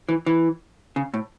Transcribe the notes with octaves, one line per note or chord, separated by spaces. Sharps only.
E3
E3
C#3
A2